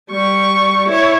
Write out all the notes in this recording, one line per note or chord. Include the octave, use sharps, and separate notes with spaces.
G3 C#6
E4 C#5